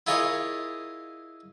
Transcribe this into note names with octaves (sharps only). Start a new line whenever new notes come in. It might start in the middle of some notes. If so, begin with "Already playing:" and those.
E4 F4 G#4 A#4 C#5 D#5